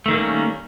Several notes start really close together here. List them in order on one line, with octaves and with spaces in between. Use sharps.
A3 D#3 G3 A#3 C#4